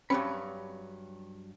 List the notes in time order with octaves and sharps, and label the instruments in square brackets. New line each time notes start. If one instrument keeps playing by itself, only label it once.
[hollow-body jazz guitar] G2 F#3 B5 [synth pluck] C4 C#4 C#7